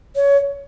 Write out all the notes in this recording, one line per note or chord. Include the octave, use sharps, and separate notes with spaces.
C#5